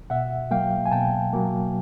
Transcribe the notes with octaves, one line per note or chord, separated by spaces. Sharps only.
B2 E5 F#5
F#3 A#3 F5 G5
G#5
B2 G5 A5
F#3 A#3